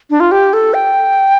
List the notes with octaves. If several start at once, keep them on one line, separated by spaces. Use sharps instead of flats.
D4
F4
G4
A4
G5